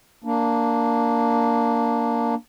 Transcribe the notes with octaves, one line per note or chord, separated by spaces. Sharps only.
A#3 D4